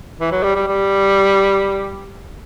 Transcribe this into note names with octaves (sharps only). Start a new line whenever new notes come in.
E3
F#3
G3
G3
G3